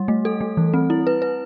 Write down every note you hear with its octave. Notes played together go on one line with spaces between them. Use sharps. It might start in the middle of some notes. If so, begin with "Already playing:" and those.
Already playing: G3
A3
A4
A3
E3
C4
E4
B4
B4